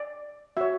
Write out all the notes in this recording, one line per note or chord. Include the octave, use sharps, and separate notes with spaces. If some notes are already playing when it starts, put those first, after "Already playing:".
Already playing: D5
F#4 C#5 E5